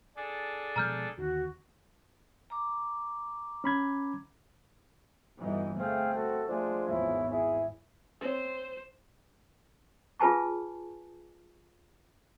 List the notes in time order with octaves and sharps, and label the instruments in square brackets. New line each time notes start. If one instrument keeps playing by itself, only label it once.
[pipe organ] D4 G#4 A4
[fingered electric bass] B2 F3 G#3 [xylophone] A#5 F6 G6
[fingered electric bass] D#2 D3 D#3 [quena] F#4
[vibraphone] A#5 D6
[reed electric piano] C#4 B5 G#6
[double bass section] G1 E3 [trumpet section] D#4 F#4 D#5
[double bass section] A3 [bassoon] C4 [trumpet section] G#4 F5 G5
[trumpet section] F#4 A4
[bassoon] F3 [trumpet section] G#3 D4 G#4 [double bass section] A3
[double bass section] G#1 E2 G#2 [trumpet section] E4 G#4 C#5
[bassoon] E4 [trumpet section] G#4
[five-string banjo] C4 C#5 [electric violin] C5
[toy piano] F4 G#4 B4 G#5 A5 C#6